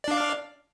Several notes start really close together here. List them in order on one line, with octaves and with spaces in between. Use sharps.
D5 D4 F5